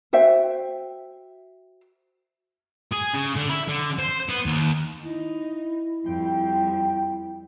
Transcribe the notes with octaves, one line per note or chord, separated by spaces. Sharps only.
F#4 C5 E5 G5
G#4
C#3
D3
E4
D3
C5
B3
D#2
D#4 E4
F2 G3 G5